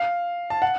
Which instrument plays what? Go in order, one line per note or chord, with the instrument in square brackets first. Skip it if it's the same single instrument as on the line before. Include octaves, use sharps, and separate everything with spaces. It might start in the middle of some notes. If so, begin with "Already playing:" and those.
Already playing: [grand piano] F5
A5
F#5